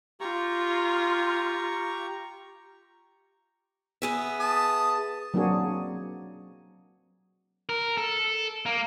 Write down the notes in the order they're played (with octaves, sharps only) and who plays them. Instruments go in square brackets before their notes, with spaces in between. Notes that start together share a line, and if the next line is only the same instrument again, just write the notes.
[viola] F4 [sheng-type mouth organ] G4 A#5 C#6
[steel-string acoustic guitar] B3 G#4 E5
[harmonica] A5 D#6
[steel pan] F#3 A#3 C4 D4 F#4 G#4
[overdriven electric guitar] A#4
A4
A#3